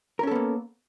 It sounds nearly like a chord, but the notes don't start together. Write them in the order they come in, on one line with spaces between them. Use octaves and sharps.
A#4 C#4 A4 B3 A#3